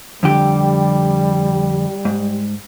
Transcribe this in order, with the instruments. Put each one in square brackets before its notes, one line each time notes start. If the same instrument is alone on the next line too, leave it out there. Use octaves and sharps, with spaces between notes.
[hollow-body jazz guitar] F2 D3 G4 [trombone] G3
[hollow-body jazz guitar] G#2